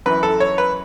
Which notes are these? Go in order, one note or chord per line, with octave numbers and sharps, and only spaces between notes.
F#2 E3 B4
A4
C#5
B4